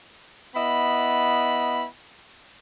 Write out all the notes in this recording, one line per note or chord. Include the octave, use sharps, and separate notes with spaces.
B3 E4 D#5 B5